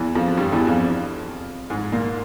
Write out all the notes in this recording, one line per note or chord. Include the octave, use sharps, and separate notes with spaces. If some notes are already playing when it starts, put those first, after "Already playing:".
Already playing: E2 E3
F2 F3
G2 G3
E2 E3
F2 F3
G#2 G#3
A#2 A#3